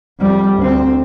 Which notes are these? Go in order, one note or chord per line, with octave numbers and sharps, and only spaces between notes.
F2 G3
D2 C4